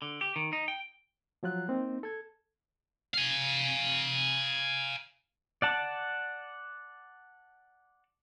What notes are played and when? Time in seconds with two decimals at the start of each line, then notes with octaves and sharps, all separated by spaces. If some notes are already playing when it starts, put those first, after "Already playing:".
0.02 D3
0.21 G4
0.36 D#3
0.53 D#4
0.68 G5
1.43 F3 F#3 F4 F#6
1.68 A#3 C4 D#4
2.03 A4 G#6
3.14 F5 G#5
5.62 D5 F#5 A5